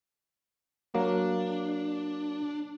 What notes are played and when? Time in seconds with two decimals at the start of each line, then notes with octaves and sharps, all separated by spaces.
0.95 F#3 A#3 D4